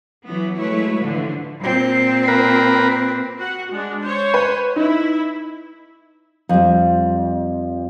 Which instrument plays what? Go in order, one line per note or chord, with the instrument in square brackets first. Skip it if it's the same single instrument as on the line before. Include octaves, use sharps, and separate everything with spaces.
[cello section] E3 F#3 B3
F#3 G#3 A3 E4 B4 C#5
A2 D3 E3 F3
[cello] A#2 C4
[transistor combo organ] A#4 B4
[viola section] F#4 F#5
G#3 D4
C5 C#5
[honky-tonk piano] B4
[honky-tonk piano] D#4 [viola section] E4
[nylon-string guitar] F2 G3